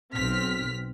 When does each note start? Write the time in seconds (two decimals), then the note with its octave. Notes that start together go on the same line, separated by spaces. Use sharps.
0.14 B1 C4 F6 B6